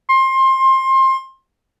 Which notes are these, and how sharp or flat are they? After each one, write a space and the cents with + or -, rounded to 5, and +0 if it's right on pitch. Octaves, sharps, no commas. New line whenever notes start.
C6 +25